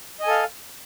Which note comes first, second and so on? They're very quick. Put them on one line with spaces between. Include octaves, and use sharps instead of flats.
D#5 G#5 A4 F5